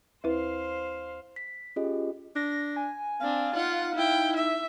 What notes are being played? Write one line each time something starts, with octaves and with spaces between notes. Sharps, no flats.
D#2 E4 B4 C5 F5
B6
C#4 F4 G4 G#4 D#5
D4 A#6
G#5
C4 D4 F5
D#4 F4 F#5
E4 G5
E5